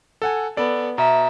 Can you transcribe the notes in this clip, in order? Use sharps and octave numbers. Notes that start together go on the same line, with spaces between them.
A4 F#5 G#5
B3 A4 D5
B2 E5 A#5